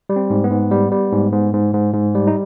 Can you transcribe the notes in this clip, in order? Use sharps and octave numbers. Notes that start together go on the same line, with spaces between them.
G3
C4
G#2
B3
G#2
G3
G3
G#2
G#2
G#2
G#2
G#2
G3
D#4